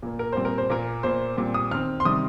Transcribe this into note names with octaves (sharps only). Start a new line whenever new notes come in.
A#2 A#3
A#4
A#2 G3 C4 C5
A#4
C5
A#2 A#3 A#4
A#2 A#3 C5
A#2 G3 C4
D#6
D#3 C4 F6
C6
C3 D#3 G3 D#6